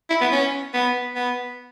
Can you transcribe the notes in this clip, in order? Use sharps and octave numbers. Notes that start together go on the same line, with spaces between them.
E4
B3
C#4
B3
B3